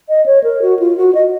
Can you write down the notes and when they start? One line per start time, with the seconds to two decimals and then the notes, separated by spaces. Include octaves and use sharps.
0.09 D#5
0.26 C#5
0.44 A#4
0.62 F#4
0.79 F4
0.97 F#4
1.15 D#5